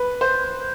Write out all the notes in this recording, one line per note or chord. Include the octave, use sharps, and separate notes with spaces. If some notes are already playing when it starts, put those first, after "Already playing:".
Already playing: B4
C5